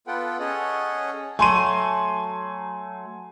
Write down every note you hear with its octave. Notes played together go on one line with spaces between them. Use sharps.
B3 F4 A4 B4 F#5 G5
C#4 G#4 A4 C#5 D#5 F#5
F#3 A3 G#5 C6 D#7